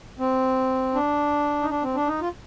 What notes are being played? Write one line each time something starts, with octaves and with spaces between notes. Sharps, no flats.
C4
D4
D#4
D4
C4
D4
D#4
F4